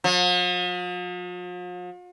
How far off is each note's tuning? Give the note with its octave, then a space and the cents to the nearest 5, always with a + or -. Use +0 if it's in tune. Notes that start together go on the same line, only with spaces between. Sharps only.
F3 +45